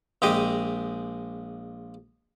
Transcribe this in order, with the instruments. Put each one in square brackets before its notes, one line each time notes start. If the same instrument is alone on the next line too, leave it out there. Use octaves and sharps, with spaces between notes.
[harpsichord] A#1 G#3 G4 G#4 D#5